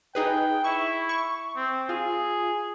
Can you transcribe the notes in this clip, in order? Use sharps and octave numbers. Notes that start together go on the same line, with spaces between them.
D#4 G#4 B4 G5
E4 C#6
C#6
C4
F4 G#4